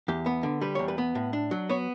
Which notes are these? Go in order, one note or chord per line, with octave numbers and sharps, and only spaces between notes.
E2 G4
B3
D3
G3 B4
E2 C#5
B4
B3
A2
D4
F#3
B3 C#5